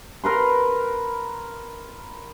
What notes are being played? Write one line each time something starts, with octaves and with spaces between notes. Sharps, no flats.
A#4 B4 C6